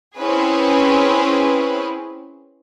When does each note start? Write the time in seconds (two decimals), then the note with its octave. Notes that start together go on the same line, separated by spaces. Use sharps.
0.17 C4 C#4 E4 G#4 B4